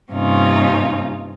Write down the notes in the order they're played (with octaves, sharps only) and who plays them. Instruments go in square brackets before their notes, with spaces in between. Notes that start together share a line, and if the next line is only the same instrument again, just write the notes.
[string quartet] G2 C3 A#3 C#4 D#4 F4